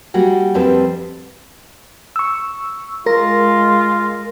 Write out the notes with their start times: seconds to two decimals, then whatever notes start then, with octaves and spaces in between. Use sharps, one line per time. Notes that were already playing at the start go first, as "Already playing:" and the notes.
0.14 G3 A#3 F#4 G#4
0.54 F2 G3 C4 A4 B4
2.16 C#6 E6
3.06 G#3 F4 A#4 A#6